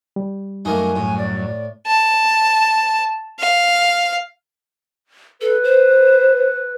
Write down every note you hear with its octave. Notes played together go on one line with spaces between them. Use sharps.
G3
F#2 A3 A#3 D#4 G#5
A2
D5
A5
F5
A4 B4
C5